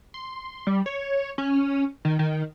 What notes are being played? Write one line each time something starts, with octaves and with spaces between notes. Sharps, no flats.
C6
G3
C#5
C#4
D#3
D#3